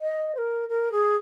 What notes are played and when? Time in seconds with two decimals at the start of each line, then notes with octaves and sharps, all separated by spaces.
0.01 D#5
0.35 C5
0.38 A#4
0.69 A#4
0.92 G#4